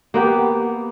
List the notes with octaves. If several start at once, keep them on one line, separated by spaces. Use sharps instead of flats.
A#3 B3 G4